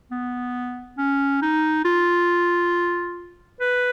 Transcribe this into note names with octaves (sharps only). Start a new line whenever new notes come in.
B3
C#4
D#4
F4
B4